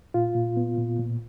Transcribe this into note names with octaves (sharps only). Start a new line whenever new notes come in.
A#2 F4
A#2
B3
A#2
A#2